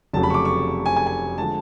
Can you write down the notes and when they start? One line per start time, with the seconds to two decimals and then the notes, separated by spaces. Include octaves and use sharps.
0.13 F1 F2 C#3 F#3 A3 A5
0.23 B5
0.30 C#6
0.34 D6
0.45 C#6
0.86 G#5
0.96 G#5
1.07 G#5
1.37 D3 F3 G#3 A5